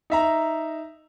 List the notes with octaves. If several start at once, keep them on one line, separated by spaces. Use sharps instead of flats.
D#4 E5 A#5